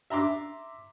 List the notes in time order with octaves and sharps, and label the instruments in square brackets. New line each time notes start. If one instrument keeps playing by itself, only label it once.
[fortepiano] E5 A#5 C6 D6